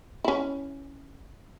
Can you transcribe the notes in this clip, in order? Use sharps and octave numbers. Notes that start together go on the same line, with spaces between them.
C#4 E4